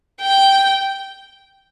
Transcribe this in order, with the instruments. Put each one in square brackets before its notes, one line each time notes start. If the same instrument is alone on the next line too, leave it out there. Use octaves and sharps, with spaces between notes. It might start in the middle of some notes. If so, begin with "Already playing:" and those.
[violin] G5